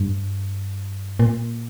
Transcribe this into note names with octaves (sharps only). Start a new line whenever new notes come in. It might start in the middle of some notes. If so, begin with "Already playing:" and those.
Already playing: G2
A#2